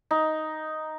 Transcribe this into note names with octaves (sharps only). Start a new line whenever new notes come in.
D#4